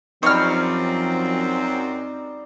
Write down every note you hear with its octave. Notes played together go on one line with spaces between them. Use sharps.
F#2 F3 G3 C4 D#4 C#5 F6